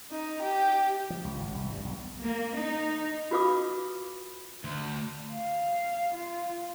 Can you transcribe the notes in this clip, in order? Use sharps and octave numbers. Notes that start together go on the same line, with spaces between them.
D#4
G4
F3
C#2
G#1
C2
G2
B1
A#3
D#4
F4 F#4 B4 F5 D6 D#6
D2
F5
F4